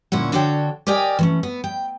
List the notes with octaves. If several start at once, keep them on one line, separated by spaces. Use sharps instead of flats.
D2 A#2 C#4 E4 F#5
D3 D4 F#4 A4 C#5 G5
G4 A#4 D5 D#5 G5 G#5
E3 A3 C#4
B3
G5